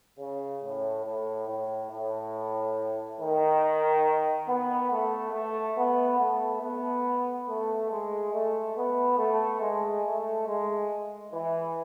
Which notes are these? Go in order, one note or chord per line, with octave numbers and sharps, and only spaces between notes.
C#3
A2
A2
A2
A2
D#3
B3
A3
A3
B3
A3
B3
A3
G#3
A3
B3
A3
G#3
A3
G#3
E3